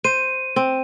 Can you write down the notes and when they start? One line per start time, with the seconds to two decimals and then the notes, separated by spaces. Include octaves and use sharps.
0.04 C5 D#7
0.56 C4